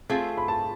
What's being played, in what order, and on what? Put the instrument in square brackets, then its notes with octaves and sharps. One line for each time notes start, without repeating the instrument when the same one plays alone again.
[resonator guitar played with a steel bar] A3 C4 F4 G#4
[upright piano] B5
A5